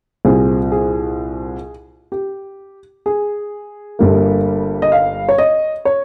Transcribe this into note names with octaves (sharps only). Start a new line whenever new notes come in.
C2 A#2 G3 C4 G#4
G#4
G4
G#4
G1 G2 G3 A#3
D#5
F5
C#5
D#5
C#5